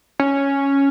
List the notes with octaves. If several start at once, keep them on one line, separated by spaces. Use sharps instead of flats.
C#4